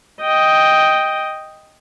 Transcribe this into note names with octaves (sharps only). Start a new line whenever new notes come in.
D#5 G5